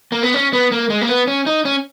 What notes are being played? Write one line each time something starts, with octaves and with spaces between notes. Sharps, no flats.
A#3
B3
C#4
B3
A#3
G#3
A#3
B3
C#4
D#4
C#4